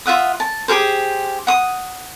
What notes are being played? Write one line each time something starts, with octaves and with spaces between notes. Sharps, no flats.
F4 E5 F#5 D#6
A5
G4 G#4 A#4 C5
F#5 D#6